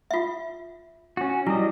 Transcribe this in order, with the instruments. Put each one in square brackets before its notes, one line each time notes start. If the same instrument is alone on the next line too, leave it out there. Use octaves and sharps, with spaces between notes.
[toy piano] F4 E5
[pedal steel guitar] C#4 F#4
[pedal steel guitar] F#3 G3 D#5 [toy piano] E4